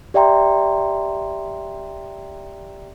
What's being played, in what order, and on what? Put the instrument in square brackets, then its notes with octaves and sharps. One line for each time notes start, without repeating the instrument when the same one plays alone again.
[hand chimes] G4 D5 E5 G5 A#5 C6